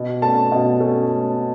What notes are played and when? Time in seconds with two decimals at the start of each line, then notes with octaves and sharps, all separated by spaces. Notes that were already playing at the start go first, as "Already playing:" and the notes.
Already playing: B2
0.22 A3 C#4 A5
0.52 B2
0.80 A3 C#4